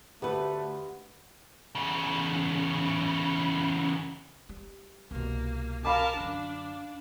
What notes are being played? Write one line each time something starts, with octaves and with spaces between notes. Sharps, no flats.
D2 A3 B3 G4 B4
E2 C#3
G3
C2 B2 A#3
A#4 F5 A5 B5 D6
F#2 D3 D4